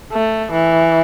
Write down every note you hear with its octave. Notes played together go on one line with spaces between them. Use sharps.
A3
E3